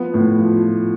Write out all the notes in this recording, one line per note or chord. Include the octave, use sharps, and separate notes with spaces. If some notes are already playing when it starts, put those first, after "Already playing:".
Already playing: F3 B3 B4
A2
F3
F3